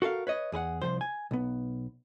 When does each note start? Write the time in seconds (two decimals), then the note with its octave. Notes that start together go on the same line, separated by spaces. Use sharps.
0.02 F#4 A4 A#4 F5
0.27 B4 C#5 D#5
0.52 E2 G#4 B4 F#5
0.82 C2 A#2 F3 C5
1.01 G#5
1.31 B1 B3